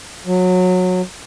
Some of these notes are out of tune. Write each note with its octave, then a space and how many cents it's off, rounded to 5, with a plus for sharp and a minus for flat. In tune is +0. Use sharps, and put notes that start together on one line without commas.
F#3 -20